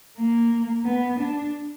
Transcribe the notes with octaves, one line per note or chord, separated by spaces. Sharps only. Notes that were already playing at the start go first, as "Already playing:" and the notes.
A#3
B3
D4